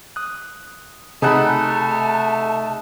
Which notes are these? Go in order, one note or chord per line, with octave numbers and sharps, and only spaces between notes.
D#6 F#6
C3 A3 D#4 G#4 F#5 G#5 A5 B5